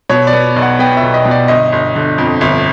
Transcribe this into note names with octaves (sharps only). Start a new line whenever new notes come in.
B2 C#5
D5
B3
B1
F#5
B3 G5
E5
B1
D#5
B2
D5
G1 D#5
G1
D3
F2
G1